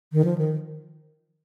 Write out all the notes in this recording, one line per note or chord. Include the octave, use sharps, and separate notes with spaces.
D#3
F3
D#3